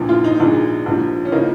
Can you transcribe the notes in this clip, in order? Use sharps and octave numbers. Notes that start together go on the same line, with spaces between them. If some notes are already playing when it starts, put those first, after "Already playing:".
Already playing: A#1 A#2 F3
F4
D#4
A#1 A#2 G#3
A#1 G#2 F3
C#4
C#3 F3 A#3 D#4